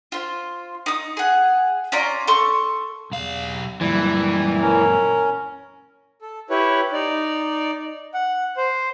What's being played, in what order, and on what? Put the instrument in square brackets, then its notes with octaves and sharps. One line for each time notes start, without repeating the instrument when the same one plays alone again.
[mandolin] F4 C5
D#4 D#6
G#4 F#5
C#4 F4 D5 A#5
A4 C6 C#6
[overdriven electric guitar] B1 F5 [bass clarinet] E2
[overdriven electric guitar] F#2 A#2 [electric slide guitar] E3 [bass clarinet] G3
[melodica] C#4 [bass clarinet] A#4
[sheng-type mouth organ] A4
E4 G4 B4 C#5
D#4 D5
F#5
C5